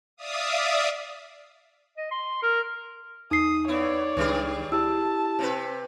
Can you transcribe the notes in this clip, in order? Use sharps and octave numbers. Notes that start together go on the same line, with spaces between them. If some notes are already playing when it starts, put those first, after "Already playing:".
D5 E5 F5 D#6
D#5
C6
A#4
E2 D#4 D#6 C7
B3 E4 C#5 D5
C#2 D#3 G3 D4 G#4
E4 G4 A5 E6
C3 C4 B4